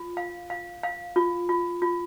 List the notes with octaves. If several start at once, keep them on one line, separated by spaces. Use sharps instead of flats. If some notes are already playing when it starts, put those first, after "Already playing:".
Already playing: F4
F5
F5
F5
F4
F4
F4